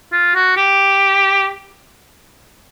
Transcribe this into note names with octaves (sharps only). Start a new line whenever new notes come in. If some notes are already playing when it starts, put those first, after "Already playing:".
F4
F#4
G4